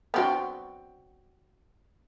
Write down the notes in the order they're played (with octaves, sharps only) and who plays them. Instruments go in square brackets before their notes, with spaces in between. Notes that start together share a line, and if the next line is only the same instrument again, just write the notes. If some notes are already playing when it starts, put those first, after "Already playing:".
[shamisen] B3 C4 D4 [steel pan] F#4 G5